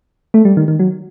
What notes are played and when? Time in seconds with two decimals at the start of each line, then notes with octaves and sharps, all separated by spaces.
0.34 A3
0.45 G3
0.57 D#3
0.68 D#3
0.79 F#3